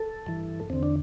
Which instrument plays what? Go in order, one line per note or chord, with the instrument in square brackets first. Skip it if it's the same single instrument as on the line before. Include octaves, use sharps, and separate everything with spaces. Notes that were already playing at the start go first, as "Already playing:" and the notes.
Already playing: [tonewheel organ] A4
G2 E3
E2 D3 C4
D4